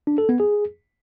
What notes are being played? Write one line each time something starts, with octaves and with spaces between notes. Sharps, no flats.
D4
A4
B3
G#4